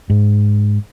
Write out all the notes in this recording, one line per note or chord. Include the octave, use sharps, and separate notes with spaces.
G#2